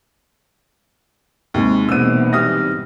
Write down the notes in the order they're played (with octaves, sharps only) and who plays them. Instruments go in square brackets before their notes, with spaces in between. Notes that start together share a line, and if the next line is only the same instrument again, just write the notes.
[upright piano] D#2 G#3 [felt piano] G#2 C3
[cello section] E2 B2 [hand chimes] A#3 C4 [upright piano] E6 D#7
[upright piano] E3 G3 D#6 [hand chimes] F6 A#6